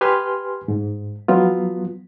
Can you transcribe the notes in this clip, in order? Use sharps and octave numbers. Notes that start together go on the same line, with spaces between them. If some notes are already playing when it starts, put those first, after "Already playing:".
G4 B4 G#5 C6 F6
G#2
F3 F#3 B3 F4